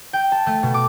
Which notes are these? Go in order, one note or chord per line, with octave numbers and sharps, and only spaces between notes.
G5
A5
A3
B2
D6